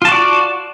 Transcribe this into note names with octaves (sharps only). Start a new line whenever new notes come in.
F4 F#4 D5 A5